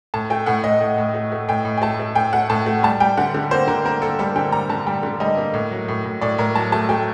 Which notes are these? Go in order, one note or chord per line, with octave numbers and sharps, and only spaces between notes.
A2 A5
A3 G5
A2 F#5
A2 D#5
A2
A2
A3
A3
A2 G5
A2
G5
A3 A5
A3
A2 G5
A3 F#5
A2 A5
A3
G3 A5
G3 G5
D3 F#5
D3
A#3 C5
D3 A#4
A#3 A#4
A#3 A4
G3 A4
D3 G5
G3 A#5
D3 A5
G3 G5
D3
G3 D#5
A#3
A2
F#3
A2
A2
A2 D5
A2 A#4
F#3 A5
A3 A5
A3 G5